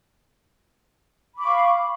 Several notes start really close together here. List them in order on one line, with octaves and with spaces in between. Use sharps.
B5 D6 C#6 F5